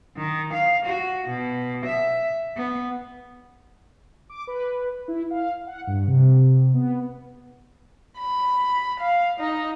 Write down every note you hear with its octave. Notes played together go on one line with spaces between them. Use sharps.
D#3
F5
F#4
B2
E5
B3
D6
B4
E4
F5
F#5
G2
C3
B3
B5
F5
D#4